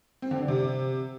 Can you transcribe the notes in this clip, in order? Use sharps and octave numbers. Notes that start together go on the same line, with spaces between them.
C4
D3
D4
C3